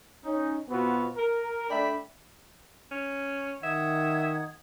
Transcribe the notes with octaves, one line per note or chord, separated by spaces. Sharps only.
C#4 D#4
B2 B3 C4 F4 F#4
A#4
A3 D4 D5 E5 G5 B5
C#4
D#3 E5 F#5 D#6 G#6